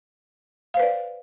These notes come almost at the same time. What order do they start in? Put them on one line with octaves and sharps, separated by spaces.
F5 C5 B4 D5